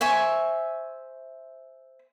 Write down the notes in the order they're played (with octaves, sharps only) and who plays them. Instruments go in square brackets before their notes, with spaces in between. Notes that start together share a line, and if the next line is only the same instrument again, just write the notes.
[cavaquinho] C5 E5 G#5 C#6